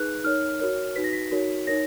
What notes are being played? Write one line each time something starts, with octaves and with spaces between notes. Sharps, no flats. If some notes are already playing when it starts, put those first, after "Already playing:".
Already playing: D#4 G#4 B4 F#6
D#4 A#4 C#5 F6
F#4 A#4 C#5
D#4 F#4 B4 B6
A#6
B6
D#4 F#4 A#4 C#5
D#4 A#4 C#5 A#6